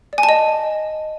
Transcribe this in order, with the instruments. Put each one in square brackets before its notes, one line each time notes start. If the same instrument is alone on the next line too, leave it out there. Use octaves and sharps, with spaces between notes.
[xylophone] D5
G#5
A5
D#5